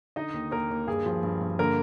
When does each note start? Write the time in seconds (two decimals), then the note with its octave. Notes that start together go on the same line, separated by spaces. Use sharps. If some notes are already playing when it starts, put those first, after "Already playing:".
0.16 D3 D#4 D#5
0.34 D#2
0.51 D#2 A#3 A#4
0.70 D#2
0.87 G2 G#4
1.06 F3
1.23 G2
1.41 G2
1.59 D3 A#3 A#4